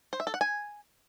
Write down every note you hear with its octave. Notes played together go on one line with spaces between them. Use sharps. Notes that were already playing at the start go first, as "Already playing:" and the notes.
C5
E5
A4
F#5
G#5